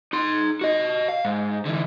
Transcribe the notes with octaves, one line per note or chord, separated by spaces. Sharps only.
D#4 C6
F#4 D#5
F5
G#2
D3 E3